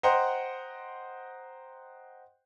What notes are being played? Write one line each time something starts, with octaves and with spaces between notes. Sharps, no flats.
C5 D#5 F#5 G5 A#5 C6